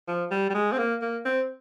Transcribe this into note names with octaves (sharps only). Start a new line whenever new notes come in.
F3
G3
G3
G#3
C4
A#3
A#3
C4